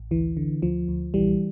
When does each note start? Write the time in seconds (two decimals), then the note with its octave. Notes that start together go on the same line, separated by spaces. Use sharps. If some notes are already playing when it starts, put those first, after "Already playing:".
Already playing: A1
0.11 D2 E3
0.37 D3
0.62 D2 F3
0.88 D2
1.14 A#1 E3 G3